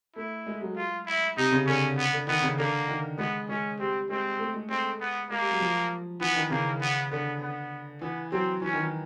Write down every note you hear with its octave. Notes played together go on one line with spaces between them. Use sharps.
A3 E4
G#3
F#3
F4
E4
C3 D#4
C#3
D3 C#4
B3
D3
D#3 B3
C#3
D3 A#3
D#3
G#3 B3
G#3 C#4
G3 C4
G#3 C4
A3
G#3
G#3 C4
B3
G#3 A#3
G3
F#3
F3
E3 B3
D#3
C#3 A#3
B3
D3 B3
B3
E3 B3
F#3 C4
E3 C#4
D#3
E3